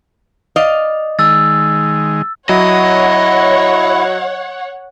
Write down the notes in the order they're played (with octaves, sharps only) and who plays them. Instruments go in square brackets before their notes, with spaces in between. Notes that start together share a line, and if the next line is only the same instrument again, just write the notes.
[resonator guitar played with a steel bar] D5 D#5 F5
[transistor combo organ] D#3 G#3 [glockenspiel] E6 A6
[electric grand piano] F#3 [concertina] E4 [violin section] C#5 F#5 [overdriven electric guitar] D#5